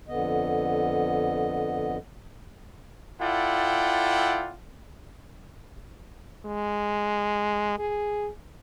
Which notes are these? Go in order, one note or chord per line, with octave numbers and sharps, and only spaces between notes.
F2 D3 B3 D#5
E4 F4 A4 D5 F#5 G5
G#3
G#4